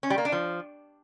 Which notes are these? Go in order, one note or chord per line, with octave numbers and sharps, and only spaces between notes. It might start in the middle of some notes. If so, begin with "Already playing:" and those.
C#4
G3
A#3
D4
F3